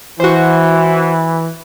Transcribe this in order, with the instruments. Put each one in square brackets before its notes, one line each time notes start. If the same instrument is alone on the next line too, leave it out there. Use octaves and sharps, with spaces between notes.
[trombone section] E3 [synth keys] F#4 C5